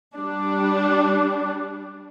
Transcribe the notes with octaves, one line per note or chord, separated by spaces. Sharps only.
G3 D4